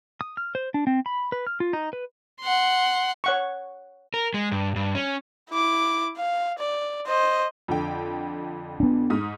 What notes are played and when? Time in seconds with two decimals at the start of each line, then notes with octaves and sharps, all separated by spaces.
0.21 D#6
0.37 F6
0.55 C5
0.74 D4
0.87 C4
1.06 B5
1.32 B4
1.47 F6
1.60 F4
1.73 D#4
1.93 B4
2.41 F#5 C6
3.24 C#5 F#5 C#6
4.14 A#4
4.34 G#3
4.52 G2
4.76 G2
4.95 C#4
5.51 E4 D6
6.18 F5
6.59 D5
7.07 C5 D#5
7.68 F2 D3 G5
8.80 B3 D4
9.10 G#2 D#6 F6